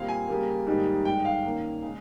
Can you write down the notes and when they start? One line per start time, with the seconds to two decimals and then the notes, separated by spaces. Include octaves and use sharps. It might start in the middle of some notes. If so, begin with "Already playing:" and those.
Already playing: A#2 G3 C4 F4 F5
0.09 G#5
0.28 C#3 G3 A#3
0.67 G#2 D#3 G3 A#3 D#4
1.05 G2 D#3 G#3 G5
1.25 F5
1.44 D#3 A#3 C#4
1.82 C#3 G#3